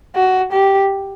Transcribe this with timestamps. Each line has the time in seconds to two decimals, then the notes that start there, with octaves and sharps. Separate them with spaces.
0.15 F#4
0.52 G4